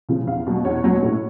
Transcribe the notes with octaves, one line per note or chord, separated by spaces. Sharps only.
C#3 F3
E2 F5
B2 F#3
E2 C#5
B2 F#3
A2